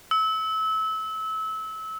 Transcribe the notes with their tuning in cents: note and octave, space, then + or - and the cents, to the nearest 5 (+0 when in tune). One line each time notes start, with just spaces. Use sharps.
E6 -25